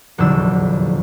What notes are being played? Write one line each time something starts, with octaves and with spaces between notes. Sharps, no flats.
F1 A#1 E2 D3 F#3 E6